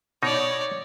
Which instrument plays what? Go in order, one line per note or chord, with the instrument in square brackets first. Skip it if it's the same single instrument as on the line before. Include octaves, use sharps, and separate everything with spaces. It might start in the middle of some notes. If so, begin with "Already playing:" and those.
[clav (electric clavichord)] B2 D#4 [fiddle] C#5 D5